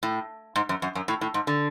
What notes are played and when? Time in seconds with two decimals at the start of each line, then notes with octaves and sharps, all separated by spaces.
0.03 A2
0.56 G#2
0.69 F#2
0.82 F#2
0.95 F#2
1.08 A2
1.21 A2
1.34 G#2
1.47 D3